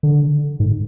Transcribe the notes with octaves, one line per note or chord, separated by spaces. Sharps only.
D3
G#2